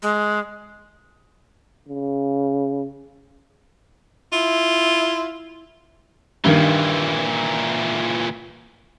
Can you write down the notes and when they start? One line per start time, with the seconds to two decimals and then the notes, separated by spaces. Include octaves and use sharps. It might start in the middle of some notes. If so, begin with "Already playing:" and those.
0.02 G#3
1.89 C#3
4.33 E4 F4
6.45 G2 A#2 D#3 E3